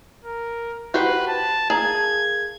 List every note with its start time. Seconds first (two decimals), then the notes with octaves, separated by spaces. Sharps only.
0.24 A#4
0.94 F#4 G4 B4 C5
1.27 A5
1.70 A#3 G#4 A5 G#6